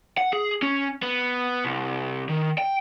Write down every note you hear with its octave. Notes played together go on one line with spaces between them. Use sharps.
F#5
G#4
C#4
B3
C2
D#3
G5